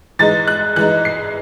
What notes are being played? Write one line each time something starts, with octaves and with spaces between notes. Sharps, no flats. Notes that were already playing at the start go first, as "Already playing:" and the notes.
E3 G#3 D#4 A6
F#6
E3 G#3 D#4 F#6
C7